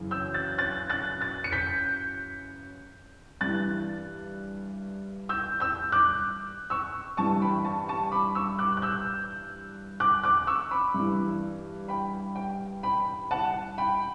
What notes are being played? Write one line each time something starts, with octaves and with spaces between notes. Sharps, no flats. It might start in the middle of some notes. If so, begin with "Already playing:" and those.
Already playing: F#2 C#3 E3
E6 G6
F#6 A6
F#6 A6
F#6 A6
F#6 A6
C#7
G6 B6
G2 E3 F#6 A6
E6 G6
E6 G6
D6 F#6
C#6 E6
G2 E3 A5 C#6
G5 B5
A5 C#6
A5 C#6
B5 D6
C#6 E6
D6 F#6
F#6
E6 G6
D6 F#6
D6 F#6
C#6 E6
B5 D6
G2 E3
G5 B5
G5
G5 B5
F#5 A5
G5 B5